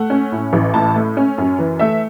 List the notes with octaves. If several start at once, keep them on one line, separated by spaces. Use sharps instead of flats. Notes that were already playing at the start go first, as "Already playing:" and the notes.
Already playing: A3 F#5
C#4
A2
A1
A2 A5
A3
C#4
F#2
E3
A3 E5